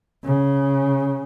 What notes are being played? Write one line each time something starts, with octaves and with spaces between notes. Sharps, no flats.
C#3